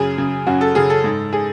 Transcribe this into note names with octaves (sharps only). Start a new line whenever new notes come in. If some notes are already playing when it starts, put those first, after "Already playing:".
Already playing: F#2 C#3 G#4
F#2 C#3
F#2 C#3 F#4
A4
F#2 C#3 G#4
A4
G#2
G#4